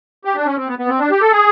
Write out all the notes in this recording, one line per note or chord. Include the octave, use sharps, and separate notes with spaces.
G4
D4
C#4
C4
B3
B3
C4
D4
G4
A4
G#4